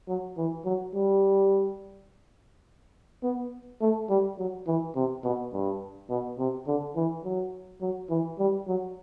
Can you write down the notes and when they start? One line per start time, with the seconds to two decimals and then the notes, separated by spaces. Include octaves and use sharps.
0.08 F#3
0.37 E3
0.65 F#3
0.94 G3
3.23 B3
3.81 A3
4.09 G3
4.38 F#3
4.67 E3
4.95 C3
5.23 B2
5.53 G2
6.09 B2
6.38 C3
6.67 D3
6.96 E3
7.24 F#3
7.81 F#3
8.10 E3
8.39 G3
8.67 F#3